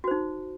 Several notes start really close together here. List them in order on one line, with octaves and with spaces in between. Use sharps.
F#4 C5 D#4